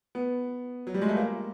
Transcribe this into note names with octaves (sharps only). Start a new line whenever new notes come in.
B3
F#3
G3
G#3
A3
A#3